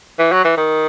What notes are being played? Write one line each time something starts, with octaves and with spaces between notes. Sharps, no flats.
E3
F#3
E3
D#3